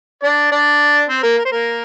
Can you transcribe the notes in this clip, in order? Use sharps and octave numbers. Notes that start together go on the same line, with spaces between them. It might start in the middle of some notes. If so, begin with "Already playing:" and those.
D4 D5
D4 D5
C4 C5
A#3 A#4
A#4
C5
A#3 A#4